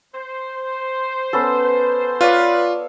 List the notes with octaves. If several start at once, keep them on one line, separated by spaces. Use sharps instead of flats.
C5
B3 C#4 A4
F4 B4 C#5 D5 F5